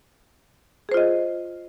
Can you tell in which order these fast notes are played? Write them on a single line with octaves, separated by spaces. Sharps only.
G#4 C5 F4 D#5